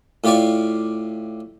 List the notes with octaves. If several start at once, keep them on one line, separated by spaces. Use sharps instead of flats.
A2 F4 G4 D5 F5 C#6